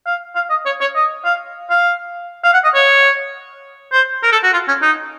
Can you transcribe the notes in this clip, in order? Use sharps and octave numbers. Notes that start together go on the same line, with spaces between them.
F5
F5
D#5
C#5
C#5
D#5
F5
F5
F5
F#5
D#5
C#5
C5
A#4
A4
F#4
F4
C#4
D#4